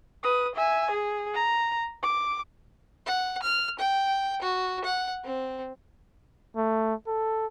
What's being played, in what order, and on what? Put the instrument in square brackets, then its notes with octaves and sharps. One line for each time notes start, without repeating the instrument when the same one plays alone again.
[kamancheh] B4 D#6
E5 G#5
G#4
A#5
D6
[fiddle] F#5
F6
G5
F#4
F#5
C4
[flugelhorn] A3
A4